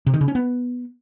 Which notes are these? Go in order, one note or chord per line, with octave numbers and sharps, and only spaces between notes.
C3
D#3
C#3
C#4
B3